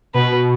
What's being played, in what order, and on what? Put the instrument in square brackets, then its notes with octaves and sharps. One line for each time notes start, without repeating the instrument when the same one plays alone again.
[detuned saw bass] B2 [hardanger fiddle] B4